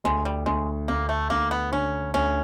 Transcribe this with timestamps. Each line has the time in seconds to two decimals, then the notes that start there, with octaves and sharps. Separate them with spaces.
0.04 D2 G#3
0.25 G3
0.46 D2 G#3
0.88 D2 A#3
1.09 A3
1.30 D2 A#3
1.51 B3
1.72 D3 C#4
2.14 D2 C#4